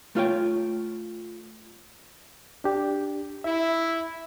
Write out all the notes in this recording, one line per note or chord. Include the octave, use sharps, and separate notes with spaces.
A3 F4 C#5 G5
D4 G4
E4 E5